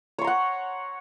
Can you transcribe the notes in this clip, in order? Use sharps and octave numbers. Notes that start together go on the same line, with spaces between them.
C#5 F#5 A#5 C6